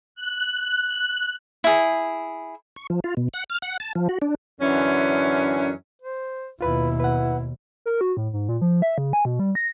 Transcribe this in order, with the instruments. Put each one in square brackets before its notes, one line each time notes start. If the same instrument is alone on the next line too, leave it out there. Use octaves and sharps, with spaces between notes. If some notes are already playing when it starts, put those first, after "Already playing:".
[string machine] F#6
[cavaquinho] E4 G#4
[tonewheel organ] C#6
F3
F4
B2
F#5
F6
F#5
A5
F3
F#4
D4
[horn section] F#2 D3 E3 C#4
[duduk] C5
[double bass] D#2 B2 [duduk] E4 [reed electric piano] F4 B4 B5
[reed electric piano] B4 F#5
[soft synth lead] A#4
F#4
A2
G#2
A#2
F3
E5
C#3
G#5
B2
G3
A#6